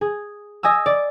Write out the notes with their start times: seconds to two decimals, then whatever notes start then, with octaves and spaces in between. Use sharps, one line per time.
0.01 G#4
0.63 D#5 G#5 D#6 E6
0.86 D5